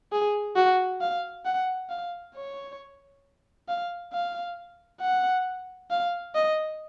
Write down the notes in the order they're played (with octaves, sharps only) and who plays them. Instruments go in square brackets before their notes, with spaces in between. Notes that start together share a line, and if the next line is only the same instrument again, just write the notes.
[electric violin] G#4
F#4
F5
F#5
F5
C#5
F5
F5
F#5
F5
D#5